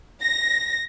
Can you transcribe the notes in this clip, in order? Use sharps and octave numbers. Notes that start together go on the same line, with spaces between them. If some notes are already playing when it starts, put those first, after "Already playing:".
A#6